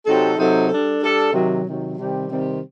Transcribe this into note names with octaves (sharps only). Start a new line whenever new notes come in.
C3 F#3 C4 D#4 A4
C3 F#3 C4 D#4 A4
G3 D4 A4
G3 D4 A4
C3 D#3 F#3
C3 D#3 F#3
C3 D#3 G3 C4 G4
C3 D#3 G3 C4 G4